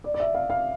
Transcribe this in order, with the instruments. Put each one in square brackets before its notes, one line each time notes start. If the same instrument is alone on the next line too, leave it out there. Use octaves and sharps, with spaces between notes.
[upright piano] D5
D5
E5
F5
F5